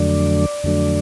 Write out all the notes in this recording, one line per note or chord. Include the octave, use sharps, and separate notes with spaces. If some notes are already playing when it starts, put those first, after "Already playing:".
Already playing: F2 D3 F#3 A3 D4 D5
F2 D3 F#3 A3 D4